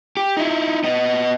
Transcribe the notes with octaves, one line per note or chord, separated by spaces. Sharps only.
G4
D#4 E4
B3 D#5